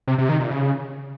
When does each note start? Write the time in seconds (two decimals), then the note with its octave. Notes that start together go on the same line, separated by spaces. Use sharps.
0.07 C3
0.18 C3
0.29 D#3
0.40 A#2
0.51 C#3